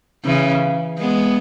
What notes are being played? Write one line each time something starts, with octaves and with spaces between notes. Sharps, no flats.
C#3 E3
G#3 B3